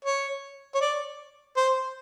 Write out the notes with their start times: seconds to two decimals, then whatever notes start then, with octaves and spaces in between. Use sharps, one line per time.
0.05 C#5
0.75 C#5
0.81 D5
1.57 C5